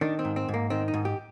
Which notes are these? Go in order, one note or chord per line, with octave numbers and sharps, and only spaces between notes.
D#3 D4
C4
G#2
C4
G#2
A#3
D#3 C4
D#4
G#2
G4